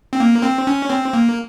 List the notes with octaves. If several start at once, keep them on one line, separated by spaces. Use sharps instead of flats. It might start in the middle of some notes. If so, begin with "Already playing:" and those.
C4
A#3
C4
C#4
C4
A#3